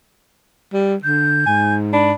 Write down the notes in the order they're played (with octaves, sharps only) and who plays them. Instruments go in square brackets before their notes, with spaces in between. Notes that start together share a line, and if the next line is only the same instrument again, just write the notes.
[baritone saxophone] G3
[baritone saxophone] D3 [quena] G6
[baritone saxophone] G#2 [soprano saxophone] G#5
[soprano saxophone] D4 [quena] B5